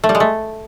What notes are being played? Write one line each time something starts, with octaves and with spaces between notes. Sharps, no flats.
A3
G3
G#3
A3